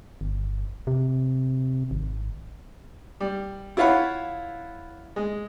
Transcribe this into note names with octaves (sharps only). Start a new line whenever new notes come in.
G1
C3
G#1
G3
E4 F4 C#5 F5 F#5 B5
G#3